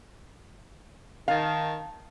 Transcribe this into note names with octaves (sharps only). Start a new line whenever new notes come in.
D#3 F5 A5